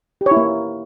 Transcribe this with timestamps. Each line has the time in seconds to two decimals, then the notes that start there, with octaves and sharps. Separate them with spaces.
0.21 G4
0.26 C#5
0.31 E4
0.37 A#3